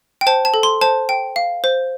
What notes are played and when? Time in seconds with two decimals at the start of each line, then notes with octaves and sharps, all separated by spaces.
0.21 G5
0.27 C5 A5
0.45 A5
0.54 A4
0.63 C6
0.81 C5 A5
1.09 G5
1.36 F5
1.64 C5